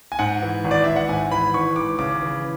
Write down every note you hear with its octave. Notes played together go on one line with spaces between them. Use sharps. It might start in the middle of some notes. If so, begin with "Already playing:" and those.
G#5
G#2 F#5
E3
G#1
D5
G#1 E5
F#5
G#2 G#5
E3 B5
G#1 C#6
G#1 D6
C#3 D6
E3